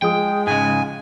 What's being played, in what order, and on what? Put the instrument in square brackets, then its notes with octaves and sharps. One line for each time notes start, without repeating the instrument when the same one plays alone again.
[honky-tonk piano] F3 G#4 D#6 [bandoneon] G#3 [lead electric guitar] G5
[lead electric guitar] G#2 C#3 [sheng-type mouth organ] G#5